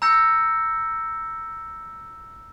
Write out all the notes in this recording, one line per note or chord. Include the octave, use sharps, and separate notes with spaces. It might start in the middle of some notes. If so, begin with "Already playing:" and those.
A#5 E6 G6 A#6 C#7